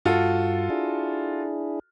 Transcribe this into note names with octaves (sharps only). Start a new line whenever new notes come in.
G2 F4 F#4 A4
D4 E4 G#4